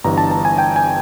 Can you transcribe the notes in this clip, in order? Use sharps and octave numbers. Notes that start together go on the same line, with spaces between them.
G1 G2 E3 A#5
A5
A5
G#5
G5
G#5